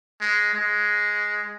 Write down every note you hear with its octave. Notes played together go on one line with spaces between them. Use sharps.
G#3
G#3